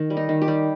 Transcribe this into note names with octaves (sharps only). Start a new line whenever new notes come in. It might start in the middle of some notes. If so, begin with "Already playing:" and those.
Already playing: D#3
G3
D#4
D#3
G4
G3